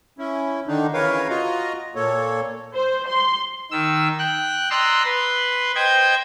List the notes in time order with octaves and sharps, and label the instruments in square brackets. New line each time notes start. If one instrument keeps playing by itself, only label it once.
[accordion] C#4 E4
D3 D#3 D4 D#4
C#3 E3 A#4 B4 C#5 F5
F4 F#4 D#5 A#5
A#2 A#3 A4 C#5
[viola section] C5
C6
[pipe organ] D#3 E6
G5 F#6
D5 D#5 A#5 C6 E6 F#6
B4 C6
C5 D#5 G5 G#6